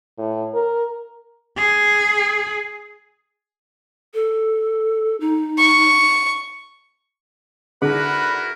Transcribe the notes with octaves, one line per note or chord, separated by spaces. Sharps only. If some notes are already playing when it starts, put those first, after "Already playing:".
A2
A#4
G#4
A4
D#4
C#6
D3 D#4 E4 F#4 G#4 A#4 B4 B5